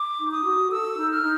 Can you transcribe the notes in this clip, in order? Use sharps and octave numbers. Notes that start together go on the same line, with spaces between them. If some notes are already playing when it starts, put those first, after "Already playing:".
Already playing: D6
D#4
D#6
F#4
A4 E6
D#4
F6
D#4